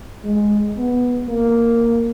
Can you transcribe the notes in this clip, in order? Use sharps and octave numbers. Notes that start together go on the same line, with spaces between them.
G#3
B3
A#3